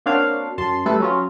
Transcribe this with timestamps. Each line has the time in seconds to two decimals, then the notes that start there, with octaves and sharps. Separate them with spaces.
0.06 A#3 C4 D4 F#4 C#5 F5
0.58 F#2 A5 C6
0.85 G3 A3 E4 A4 B4
1.00 F#3 C#4 F4